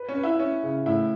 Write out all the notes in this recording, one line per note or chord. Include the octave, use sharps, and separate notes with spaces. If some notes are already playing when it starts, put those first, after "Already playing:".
Already playing: B4
C#4
B4
E4
C#4 E4
C#3
A2 E4